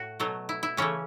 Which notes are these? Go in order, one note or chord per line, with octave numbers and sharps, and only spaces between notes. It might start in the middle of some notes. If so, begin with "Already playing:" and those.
Already playing: A2 F#4
B2 F#3 A3
E4
E4
C#3 E3 A3 C#4